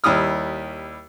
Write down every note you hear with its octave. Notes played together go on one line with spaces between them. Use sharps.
D#2 G3 E4 D#6 F6